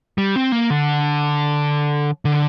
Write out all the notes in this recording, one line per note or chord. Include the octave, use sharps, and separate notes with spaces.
G3
C4
A#3
D3
D3